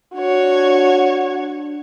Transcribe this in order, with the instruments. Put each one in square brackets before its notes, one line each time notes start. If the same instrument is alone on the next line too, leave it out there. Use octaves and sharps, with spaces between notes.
[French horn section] D4 [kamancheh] F#4 C#5